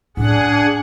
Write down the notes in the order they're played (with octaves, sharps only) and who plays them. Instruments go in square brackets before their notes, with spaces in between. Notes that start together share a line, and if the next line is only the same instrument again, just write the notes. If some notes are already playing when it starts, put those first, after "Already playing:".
[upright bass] A2 C#4 [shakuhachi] D4 [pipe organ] G#4 F#5